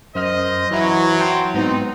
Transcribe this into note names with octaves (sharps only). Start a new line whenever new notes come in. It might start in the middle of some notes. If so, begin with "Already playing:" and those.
F#2 C5 D#5 F6
E3 F#3 E4
G5 A5 C6
G#2 B3 C4 D#4